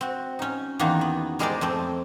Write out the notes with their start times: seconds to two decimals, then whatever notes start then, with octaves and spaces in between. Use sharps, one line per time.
0.01 C4 F#4
0.39 C#4 D#4
0.79 E2 D#3 A#3 D#4 F#4
1.01 B3
1.39 G3 G#3 G#4 A#4 C5 D5
1.61 F2 A3 C4